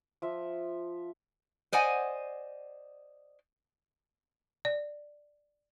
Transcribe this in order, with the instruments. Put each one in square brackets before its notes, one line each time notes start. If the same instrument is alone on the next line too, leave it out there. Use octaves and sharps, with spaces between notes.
[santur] F3 E5
[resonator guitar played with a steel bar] C5 D5 D#5 F#5 G#5
[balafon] D5